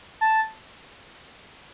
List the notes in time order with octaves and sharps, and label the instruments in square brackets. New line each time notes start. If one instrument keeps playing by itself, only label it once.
[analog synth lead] A5